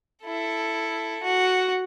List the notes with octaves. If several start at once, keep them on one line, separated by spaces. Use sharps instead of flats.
E4 A4
F#4